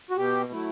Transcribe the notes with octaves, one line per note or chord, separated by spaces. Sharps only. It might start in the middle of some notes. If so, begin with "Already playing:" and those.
F#4
B2 G4
F#3 A3 E4